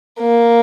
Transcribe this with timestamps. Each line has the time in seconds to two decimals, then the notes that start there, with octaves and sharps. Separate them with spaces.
0.20 A#3